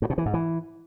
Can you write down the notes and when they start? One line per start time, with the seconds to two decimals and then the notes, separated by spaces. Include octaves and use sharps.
0.02 G2
0.10 B2
0.18 E3
0.26 G#2
0.34 E3